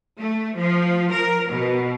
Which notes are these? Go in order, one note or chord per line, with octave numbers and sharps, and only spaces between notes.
A3
F3
A#4
B2